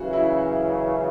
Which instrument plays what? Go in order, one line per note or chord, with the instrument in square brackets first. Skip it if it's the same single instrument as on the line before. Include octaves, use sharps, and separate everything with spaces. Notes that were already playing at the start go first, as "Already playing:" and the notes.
Already playing: [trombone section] F#2 C#3 E3 [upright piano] F#4
[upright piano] E4